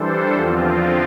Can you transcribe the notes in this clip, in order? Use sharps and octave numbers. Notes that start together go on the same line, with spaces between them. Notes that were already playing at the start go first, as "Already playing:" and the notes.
Already playing: E3 G3 D4 A4 C5
E2 D3 F3 C4 F4